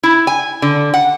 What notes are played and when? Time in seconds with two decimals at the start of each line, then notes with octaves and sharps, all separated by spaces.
0.03 E4
0.27 G#5
0.62 D3
0.94 F#5